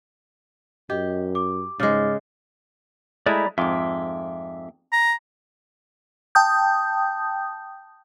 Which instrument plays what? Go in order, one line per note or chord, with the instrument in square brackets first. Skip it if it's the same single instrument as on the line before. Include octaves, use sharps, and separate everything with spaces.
[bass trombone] F#2 [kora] G4 [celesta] D#5
[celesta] D6
[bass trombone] G#2 [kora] C#3 G#3 [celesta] D6 F6 A6
[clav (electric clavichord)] G#3 A3 E4 [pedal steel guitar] D5 A#5 B5
[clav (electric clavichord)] F2 G#2 [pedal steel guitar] E5 C6 D6
[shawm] A#5
[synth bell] G5 A5 D#6 G6